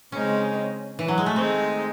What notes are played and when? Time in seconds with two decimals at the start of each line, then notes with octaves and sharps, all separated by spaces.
0.12 C#3 G#3 C4 C#4 D#4
0.99 E3
1.08 F#3
1.18 G#3
1.26 A3
1.36 D#3 G#3 C4 D#4